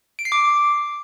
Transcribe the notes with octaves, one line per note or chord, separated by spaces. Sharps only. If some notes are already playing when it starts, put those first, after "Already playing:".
D7
C7
D6